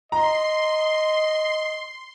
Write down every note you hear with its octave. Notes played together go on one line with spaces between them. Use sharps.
D#5 A#5 C6